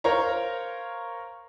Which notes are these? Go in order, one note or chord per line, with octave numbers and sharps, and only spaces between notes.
A#4 C5 C#5 F5 A#5